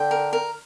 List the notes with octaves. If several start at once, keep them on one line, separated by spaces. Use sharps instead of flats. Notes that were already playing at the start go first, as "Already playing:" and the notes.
Already playing: D3 G5
A#4
A#4